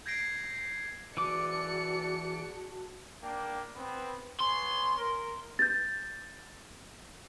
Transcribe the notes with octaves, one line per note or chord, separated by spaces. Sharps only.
G6 G#6 A#6 C7 D7
E3 F#4 G#4 D5 A5 D6 C#7
A#3 D4 G5
B3 C4 B4
B3 C#5 G#5 C6
A#4
G6 A6